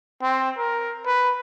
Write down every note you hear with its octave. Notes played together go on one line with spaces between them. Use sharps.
C4
A#4
B4